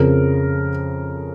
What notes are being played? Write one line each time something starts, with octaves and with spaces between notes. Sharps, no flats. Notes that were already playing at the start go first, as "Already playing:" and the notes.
Already playing: F2 C#3 F3 A#4